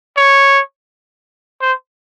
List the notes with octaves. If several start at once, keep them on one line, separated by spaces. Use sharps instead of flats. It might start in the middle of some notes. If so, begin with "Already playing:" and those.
C#5
C5